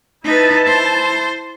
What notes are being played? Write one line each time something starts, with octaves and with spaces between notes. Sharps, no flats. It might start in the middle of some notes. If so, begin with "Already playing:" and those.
D#4 E4 B4 A5
C5